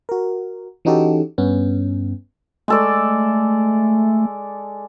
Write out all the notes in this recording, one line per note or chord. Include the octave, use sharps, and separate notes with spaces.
F#4 A#4
E3 C#4 D#4 F#4 G4 A4
G2 B3 C#4
G#3 A3 A4 D5